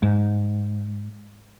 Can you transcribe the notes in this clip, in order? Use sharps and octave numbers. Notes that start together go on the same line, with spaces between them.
G#2